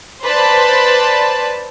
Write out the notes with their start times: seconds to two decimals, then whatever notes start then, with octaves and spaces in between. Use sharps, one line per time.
0.23 B4 C5 D5 A5 B5